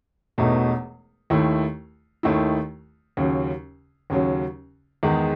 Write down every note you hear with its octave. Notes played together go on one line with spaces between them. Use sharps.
E1 E2 B2 A3 D#4
D#2 D#3 A3 E4
D#2 D#3 A3 E4
D#2 C#3 F#3 C#4
D#2 C#3 F#3 C#4
E2 D#3 G#3